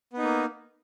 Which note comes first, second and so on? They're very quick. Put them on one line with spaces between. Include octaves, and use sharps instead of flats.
B3 D#4 A#3